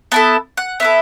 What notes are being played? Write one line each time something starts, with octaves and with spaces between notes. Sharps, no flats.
B3 E4 A4 A5
F#5
B3 E4 A4 E5